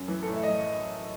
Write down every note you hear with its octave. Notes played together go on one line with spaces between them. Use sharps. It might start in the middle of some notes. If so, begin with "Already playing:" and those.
Already playing: F#2
E3
A4
A2
E5
E3 D#5